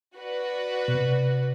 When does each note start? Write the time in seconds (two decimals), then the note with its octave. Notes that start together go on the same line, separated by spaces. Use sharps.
0.16 F#4 B4 D5
0.88 B2
0.95 C3